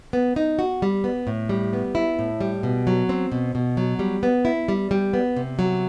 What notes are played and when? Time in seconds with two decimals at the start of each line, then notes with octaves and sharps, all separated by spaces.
0.13 B3
0.36 D#4
0.59 F#4
0.82 G3
1.04 B3
1.27 A2
1.49 G3
1.73 B3
1.95 E4
2.19 A2
2.41 G3
2.63 B2
2.87 F#3
3.09 C4
3.32 B2
3.55 B2
3.77 F#3
3.99 G3
4.23 B3
4.45 E4
4.68 G3
4.91 G3
5.13 B3
5.36 C3
5.59 F#3